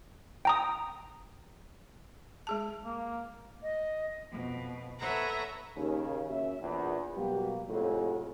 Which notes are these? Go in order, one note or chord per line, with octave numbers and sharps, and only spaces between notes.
G5 A#5 D#6
G#3 G#4 A5
A#3
D#5
F2 B2
A4 B4 C#5 E5 F#5 A#5
D#2 C#3
A#3 C#4 F#4 C#5 E5
A#1 E2
B2 F#3 G3 A#3 F#4 G4
F2 A2 C3 F#3 G#3